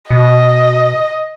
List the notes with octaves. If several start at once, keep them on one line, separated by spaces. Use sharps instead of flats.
B2 D#5